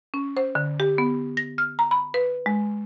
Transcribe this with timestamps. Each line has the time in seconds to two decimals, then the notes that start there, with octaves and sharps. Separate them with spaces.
0.14 C#4
0.37 C5
0.55 D3
0.80 G4
0.98 B3
1.37 A#6
1.58 F6
1.79 A#5
1.91 B5
2.14 B4
2.46 G#3